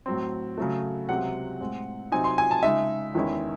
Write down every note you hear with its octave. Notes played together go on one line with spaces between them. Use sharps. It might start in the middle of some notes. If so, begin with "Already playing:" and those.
A2 F#3 C4
C#3 F#3 A3
C#2 C3 F#3 C4 F#5
A2 G#3 C4
C3 F#3 C4 D#4 G#5
C6
G#5
A5
C#3 G#3 D#4 E5
E2 D#3 G#3 C#4 E4